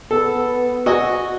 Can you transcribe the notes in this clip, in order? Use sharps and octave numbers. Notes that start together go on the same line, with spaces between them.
B3 A4
F#4 D#5 G#5